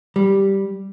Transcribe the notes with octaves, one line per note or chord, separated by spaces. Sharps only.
G3